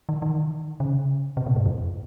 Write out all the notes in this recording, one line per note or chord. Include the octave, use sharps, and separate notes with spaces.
D#3
D#3
C#3
C3
A#2
G#2
F2